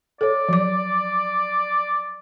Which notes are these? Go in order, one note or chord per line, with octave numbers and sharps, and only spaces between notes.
A4 C#5 D5
F3 F#3 D6